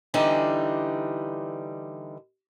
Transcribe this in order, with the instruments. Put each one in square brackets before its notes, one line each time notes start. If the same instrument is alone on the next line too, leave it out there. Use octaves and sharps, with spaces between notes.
[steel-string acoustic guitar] D3 E3 G3 D#4